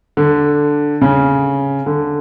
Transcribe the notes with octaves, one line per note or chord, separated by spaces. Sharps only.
D3
C#3
D3